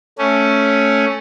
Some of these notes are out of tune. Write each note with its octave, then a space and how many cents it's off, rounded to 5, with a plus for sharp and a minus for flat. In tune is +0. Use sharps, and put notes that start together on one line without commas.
A3 +0 C#4 +0